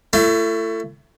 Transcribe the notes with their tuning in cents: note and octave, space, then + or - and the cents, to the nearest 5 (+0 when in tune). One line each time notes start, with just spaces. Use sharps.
A3 +20 E4 +45